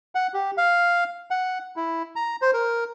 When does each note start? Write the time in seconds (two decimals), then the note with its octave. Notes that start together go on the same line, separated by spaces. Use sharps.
0.15 F#5
0.34 G4
0.57 F5
1.31 F#5
1.76 E4
2.16 A#5
2.42 C5
2.54 A#4